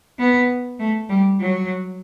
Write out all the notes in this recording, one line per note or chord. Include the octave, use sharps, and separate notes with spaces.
B3
A3
G3
F#3